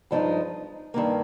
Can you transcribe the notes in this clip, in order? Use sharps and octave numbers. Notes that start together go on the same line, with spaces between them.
G2 F3 G#3 C4 D#4
G2 D#3 A#3